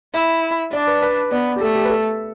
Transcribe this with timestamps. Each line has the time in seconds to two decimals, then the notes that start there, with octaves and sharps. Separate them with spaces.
0.14 E4 E5
0.72 D4 D5
0.87 B4
1.02 B4
1.31 B3 D5
1.56 G4
1.61 A3 A4
1.75 G4
1.85 B4
1.90 A4